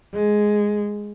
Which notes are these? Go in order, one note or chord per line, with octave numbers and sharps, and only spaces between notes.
G#3